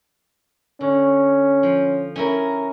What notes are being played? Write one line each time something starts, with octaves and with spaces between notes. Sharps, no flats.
D3 C#4
F3
C#4 E4 A#4